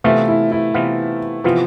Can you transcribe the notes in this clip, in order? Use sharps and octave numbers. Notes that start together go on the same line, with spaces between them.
C3 E3 A3 B3 F4
E4
E4
C3 E3 B3 F4
C3 E3 F3 B3 F4